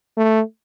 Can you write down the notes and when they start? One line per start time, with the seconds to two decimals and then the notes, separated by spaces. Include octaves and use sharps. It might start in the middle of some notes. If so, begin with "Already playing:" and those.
0.17 A3